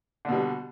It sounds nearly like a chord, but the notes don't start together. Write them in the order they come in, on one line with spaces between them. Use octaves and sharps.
D3 B2 G3